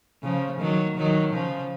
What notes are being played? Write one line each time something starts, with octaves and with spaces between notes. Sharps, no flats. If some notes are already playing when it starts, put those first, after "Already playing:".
C#3 F3
D#3 F#3
D#3 F#3
C#3 F3